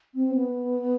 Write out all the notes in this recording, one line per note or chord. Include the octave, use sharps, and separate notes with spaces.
C4
B3